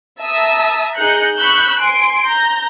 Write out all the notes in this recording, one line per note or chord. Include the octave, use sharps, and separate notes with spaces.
E5 A5 A#5 D#6 E6
D#4 G#4 A#5 F#6 G6 C#7
B5 C#6 E6 F#6 G6
G#5 C6 D7
A#5 G6